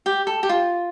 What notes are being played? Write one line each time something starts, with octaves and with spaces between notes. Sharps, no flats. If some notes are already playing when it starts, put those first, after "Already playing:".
G4
A4
G4
F4